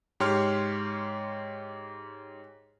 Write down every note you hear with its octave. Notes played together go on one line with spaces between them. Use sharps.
G#2 G4 C#5 C6 F6